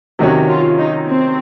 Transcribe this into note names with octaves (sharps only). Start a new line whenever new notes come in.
C3 D#3 F#3 C#4 F#4
F4
D#4
C4